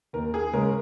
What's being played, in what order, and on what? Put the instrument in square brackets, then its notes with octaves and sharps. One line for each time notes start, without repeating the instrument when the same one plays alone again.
[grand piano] D#2 [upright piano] A#4
[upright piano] G#4
[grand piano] C#3 G#3 C#4 [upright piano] A#4